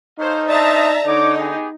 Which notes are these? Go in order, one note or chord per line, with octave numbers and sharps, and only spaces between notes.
D#4 A4 C5 C#5 F5
D4 C5 D5 E5 A5 A#5 D#6
D3 D#4 C#5 D6
B3 G4 G#4